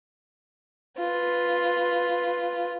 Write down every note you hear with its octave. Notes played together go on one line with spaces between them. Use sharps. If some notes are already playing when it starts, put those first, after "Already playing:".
F4 B4